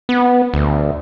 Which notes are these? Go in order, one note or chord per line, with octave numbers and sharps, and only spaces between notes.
B3
D2